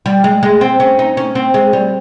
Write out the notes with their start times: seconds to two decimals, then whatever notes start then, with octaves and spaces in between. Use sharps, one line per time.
0.06 G3
0.24 G#3
0.43 G#3
0.61 C4
0.80 C#4
0.99 D#4
1.17 C#4
1.35 C4
1.54 G#3
1.73 G3